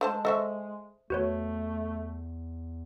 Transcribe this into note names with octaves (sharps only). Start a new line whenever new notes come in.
G#3 A3 C5 A5
A4 C5 D#5 E5 C#6
E2 A3 F#4 B4 C#5